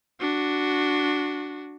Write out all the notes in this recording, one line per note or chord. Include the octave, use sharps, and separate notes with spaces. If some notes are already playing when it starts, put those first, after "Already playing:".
D4 F#4